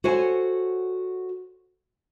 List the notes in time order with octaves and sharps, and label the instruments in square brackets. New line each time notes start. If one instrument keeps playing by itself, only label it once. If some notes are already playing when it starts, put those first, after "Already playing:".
[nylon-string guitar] F#4 A4 C5 C#5 F#5 G#5